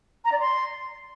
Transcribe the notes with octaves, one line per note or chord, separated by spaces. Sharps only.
A#5
D5
C6